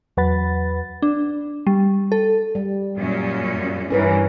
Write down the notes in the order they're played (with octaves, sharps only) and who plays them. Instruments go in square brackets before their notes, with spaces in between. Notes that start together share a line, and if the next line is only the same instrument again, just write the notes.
[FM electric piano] E2 F#3 B4 F#5 B5 A6
[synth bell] D4
G3
A4
[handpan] G3
[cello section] F#2 A#2 C#4
[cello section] G2 E3 [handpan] C#4 A#4 B4